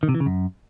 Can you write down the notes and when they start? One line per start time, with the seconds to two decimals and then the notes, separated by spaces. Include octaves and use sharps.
0.03 D#3
0.09 C3
0.15 E3
0.20 C#3
0.26 F#2